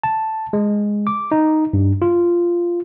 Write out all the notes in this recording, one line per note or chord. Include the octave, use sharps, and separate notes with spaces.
A5
G#3
D6
D#4
G2
F4